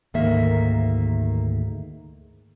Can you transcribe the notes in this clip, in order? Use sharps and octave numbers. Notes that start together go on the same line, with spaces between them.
D2 G#2 D#3 A#3 E5